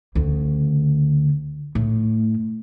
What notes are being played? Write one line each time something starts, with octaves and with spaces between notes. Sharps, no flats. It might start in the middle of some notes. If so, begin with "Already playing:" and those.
D2 C#3
A2